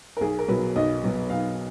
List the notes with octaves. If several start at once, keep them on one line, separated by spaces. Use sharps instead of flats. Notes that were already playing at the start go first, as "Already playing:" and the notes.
A#4
B1 G#4
A#4
B2 F#3 B4
B1 D#5
B2 F#3
B1 F5